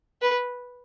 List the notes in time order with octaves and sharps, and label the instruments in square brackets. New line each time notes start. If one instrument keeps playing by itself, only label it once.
[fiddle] B4